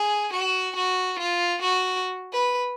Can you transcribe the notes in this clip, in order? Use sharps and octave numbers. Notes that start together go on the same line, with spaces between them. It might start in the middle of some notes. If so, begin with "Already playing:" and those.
Already playing: G#4
F#4
F#4
F4
F#4
B4